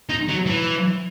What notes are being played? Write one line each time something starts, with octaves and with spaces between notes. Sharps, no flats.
D#4
F#3
E3